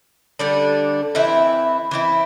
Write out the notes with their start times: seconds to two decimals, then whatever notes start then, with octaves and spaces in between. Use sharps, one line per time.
0.39 D3 G3 D4
1.15 E3 C4 E4 E5
1.91 E3 C4 E4